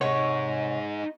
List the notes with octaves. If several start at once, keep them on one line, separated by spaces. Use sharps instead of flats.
C3 D#4 G#4 C#5 D#5 F#5